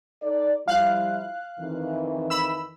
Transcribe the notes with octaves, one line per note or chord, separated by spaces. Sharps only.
D#4 A4 D5
F3 G3 E4 F5 F#6
F2 D#3 E3
B5 E6